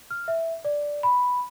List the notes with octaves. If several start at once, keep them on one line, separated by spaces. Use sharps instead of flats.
F6
E5
D5
B5